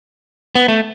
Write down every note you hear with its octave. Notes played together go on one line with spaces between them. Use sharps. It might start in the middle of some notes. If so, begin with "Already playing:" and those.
B3
A3